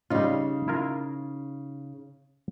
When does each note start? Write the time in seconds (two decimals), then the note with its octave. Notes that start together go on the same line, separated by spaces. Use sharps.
0.10 C#3 G3 D#4 F4
0.68 E4 F4 A#4